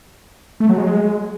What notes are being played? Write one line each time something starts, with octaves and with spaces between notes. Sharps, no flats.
A3
F#3
G#3